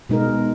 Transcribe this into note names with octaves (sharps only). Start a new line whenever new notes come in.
B2 G#3 D#4 A#4